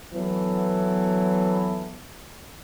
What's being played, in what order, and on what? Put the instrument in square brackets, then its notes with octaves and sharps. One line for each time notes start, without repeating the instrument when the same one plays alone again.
[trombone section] E3 F#3 B3 A4